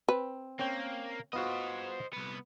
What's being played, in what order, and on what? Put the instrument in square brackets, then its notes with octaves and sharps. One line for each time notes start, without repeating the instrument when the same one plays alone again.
[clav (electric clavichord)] C4 [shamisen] B4
[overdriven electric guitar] A#3 [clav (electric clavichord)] C4 C#4 G5
[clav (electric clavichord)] B3 F4 F#4 [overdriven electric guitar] C5 D#5
[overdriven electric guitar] C2 B3